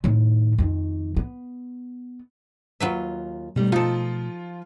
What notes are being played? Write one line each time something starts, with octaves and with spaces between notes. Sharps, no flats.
A2 D#3
F2 D#3
B3
D#2 F#3 F4 B4 E5
B2 D#3 G3 A3
F3 D#4 F4 A4